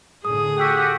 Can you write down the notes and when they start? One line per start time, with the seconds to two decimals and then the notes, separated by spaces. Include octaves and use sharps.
0.25 A2 D3 G#4 D#6
0.58 F#4 G4 G5 E6 B6